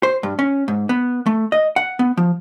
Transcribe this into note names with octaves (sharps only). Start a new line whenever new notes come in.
C5
G2
C#4
G#2
B3
A3
D#5
F#5
B3
F3